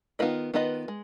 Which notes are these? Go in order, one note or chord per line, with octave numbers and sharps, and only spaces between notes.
D#3 B3 F4 B4 D#5
D#3 B3 F4 B4 D#5
G#3